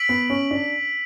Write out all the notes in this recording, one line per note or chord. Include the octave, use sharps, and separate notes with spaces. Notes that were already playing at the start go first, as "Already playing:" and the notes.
Already playing: E6 B6 D7 F#7
B3
C#4
D4